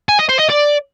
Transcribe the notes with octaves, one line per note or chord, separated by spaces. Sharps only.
G#5
D#5
C5
D#5
D5